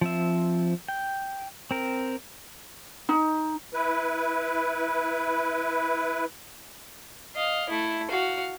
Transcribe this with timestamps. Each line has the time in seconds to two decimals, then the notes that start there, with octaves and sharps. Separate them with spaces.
0.01 F3 C4 E5
0.88 G5
1.71 C4 A#4
3.09 D#4
3.72 E4 B4
7.35 D#5 F5
7.69 A3 E4
8.10 F#4 F5